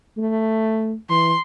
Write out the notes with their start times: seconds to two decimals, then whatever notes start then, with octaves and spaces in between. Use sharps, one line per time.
0.17 A3
1.10 E3 C6